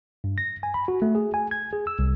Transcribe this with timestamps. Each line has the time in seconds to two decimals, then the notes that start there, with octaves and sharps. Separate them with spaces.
0.24 G2
0.38 A#6
0.63 G#5
0.74 B5
0.88 F#4
1.02 A3
1.15 G#4
1.34 G#5
1.51 G#6
1.73 G#4
1.87 E6
1.99 C2